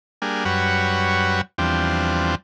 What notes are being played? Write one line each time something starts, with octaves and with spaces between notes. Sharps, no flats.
G3 A#3 D4 G#4
F#2 G3 F#4 B4 C#5
E2 F3 G3 C4 D4